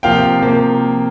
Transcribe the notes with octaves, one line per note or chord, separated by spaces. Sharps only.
C3 F3 A#3 F5 G5
C3 F3 A#3